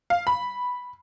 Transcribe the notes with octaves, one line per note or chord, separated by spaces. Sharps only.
F5
B5